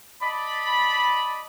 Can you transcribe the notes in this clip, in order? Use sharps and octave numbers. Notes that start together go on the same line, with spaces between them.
D5 D#5 A5 B5